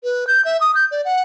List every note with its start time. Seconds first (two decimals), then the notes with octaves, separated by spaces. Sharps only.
0.04 B4
0.27 G6
0.45 E5
0.61 D#6
0.75 G6
0.91 D5
1.05 F#5